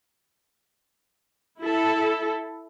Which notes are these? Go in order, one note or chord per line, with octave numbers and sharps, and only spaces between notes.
E4 A4